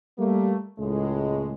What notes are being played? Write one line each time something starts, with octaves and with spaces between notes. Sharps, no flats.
G3 A3 A#3
C#2 A2 G#3